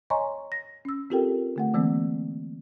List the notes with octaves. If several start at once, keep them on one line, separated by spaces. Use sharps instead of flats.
C#5 D#5 G#5 A#5 C6 C#6
A#6
C#4 E6
C4 F4 G4 A4 A#4 G5
D3 A3 F#5
D3 E3 G#3 A#3 C4